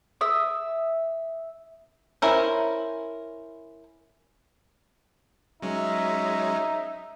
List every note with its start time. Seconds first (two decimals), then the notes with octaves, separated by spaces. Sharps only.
0.21 E5 D#6
2.22 C#4 E4 A#4 C5
5.62 F#3 G#3 C#4 D#4 E5